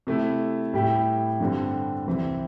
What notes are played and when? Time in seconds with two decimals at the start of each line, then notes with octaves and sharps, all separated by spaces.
0.07 C3 A3 E4
0.73 A2 G3 E4 G4
1.40 G2 D3 G3 C4
2.06 C2 C3 E3 C4 E4